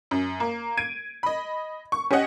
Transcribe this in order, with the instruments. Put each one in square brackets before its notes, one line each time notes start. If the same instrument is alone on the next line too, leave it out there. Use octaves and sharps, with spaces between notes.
[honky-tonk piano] F#2
A#3
G#6 D7 D#7
D#5 B5
C#6
C#4 G4 C#5 D#5 F#5